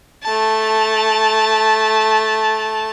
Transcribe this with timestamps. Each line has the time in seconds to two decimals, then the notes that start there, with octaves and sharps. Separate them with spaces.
0.23 A3 A5